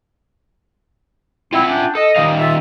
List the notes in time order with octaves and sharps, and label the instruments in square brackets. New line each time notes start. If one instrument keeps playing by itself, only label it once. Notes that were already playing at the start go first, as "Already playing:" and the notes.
[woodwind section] C4 E4 [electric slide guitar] F4 E5 F#5
[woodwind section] C#4 D4 G5
[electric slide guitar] A4 [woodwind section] D#5
[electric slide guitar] D#3 G3 F5
[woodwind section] F4 E5